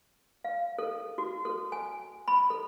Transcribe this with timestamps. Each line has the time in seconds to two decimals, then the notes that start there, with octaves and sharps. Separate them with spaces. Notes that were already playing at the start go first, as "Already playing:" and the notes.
0.45 F5
0.78 A4
1.18 F#4
1.45 A4
1.72 G#5
2.28 B5
2.50 A4